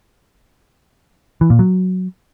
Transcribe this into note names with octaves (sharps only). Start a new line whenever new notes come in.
E3
A#2
F#3